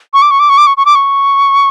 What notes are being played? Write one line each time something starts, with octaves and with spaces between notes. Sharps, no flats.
C#6
D6
C#6
D6
C#6
D6
C#6
C#6
D6
C#6